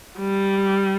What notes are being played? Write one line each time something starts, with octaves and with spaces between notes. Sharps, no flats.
G3